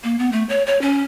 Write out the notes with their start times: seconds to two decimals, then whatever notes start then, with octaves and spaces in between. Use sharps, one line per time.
0.04 A#3
0.19 B3
0.32 A3
0.49 C#5
0.66 C#5
0.82 C#4